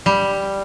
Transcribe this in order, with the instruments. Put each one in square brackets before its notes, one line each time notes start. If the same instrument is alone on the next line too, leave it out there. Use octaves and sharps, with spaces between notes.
[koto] G3